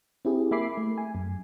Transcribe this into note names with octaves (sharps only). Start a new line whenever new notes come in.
C4 E4 G4 G#4
A#3 E5 G#5 B5 D6 C7
A3
G#5
F#2